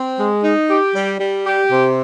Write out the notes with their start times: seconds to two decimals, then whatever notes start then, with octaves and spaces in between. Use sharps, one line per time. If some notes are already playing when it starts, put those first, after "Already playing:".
Already playing: C4
0.19 G#3
0.44 D#4
0.69 G4
0.95 G3
1.20 G3
1.46 G4
1.71 C3